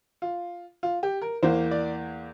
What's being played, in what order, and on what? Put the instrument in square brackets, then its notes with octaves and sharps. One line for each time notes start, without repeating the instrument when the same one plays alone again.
[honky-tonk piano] F4
F4
G4
A#4
E2 E3 A#3 C5
D5